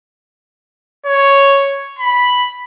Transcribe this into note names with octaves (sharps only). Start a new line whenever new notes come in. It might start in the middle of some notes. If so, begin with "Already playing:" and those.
C#5
B5